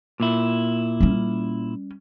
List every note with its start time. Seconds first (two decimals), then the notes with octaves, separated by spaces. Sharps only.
0.20 A#2 E4
1.01 G3 C#4